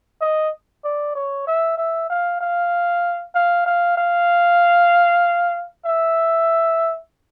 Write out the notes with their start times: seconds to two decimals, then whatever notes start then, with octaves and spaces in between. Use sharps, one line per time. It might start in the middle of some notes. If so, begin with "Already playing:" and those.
0.21 D#5
0.84 D5
1.15 C#5
1.47 E5
1.77 E5
2.10 F5
2.41 F5
3.35 F5
3.66 F5
3.97 F5
5.85 E5